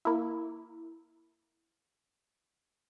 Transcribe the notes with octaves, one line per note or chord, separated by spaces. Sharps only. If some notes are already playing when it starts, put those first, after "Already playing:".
A#3 E4